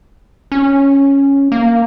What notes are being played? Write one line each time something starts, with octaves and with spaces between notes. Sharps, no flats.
C#4
A#3